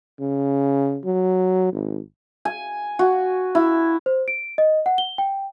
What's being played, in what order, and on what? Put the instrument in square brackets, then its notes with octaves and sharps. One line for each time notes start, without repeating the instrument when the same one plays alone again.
[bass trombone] C#3
F#3
G#1
[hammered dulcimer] G#5
F#4
E4
[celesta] C5
D7
D#5
F#5
G7
G5